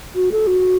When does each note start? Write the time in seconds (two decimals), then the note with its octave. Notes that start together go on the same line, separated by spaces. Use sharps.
0.15 F#4
0.32 A4
0.47 F#4